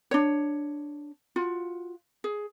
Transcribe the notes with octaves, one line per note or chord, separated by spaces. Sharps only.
D4 C#5
F4 F#4
G#4